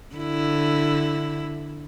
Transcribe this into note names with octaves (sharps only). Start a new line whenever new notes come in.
D3 E4